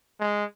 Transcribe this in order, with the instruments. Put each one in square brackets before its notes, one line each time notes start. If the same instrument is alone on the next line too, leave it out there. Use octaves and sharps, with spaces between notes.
[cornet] G#3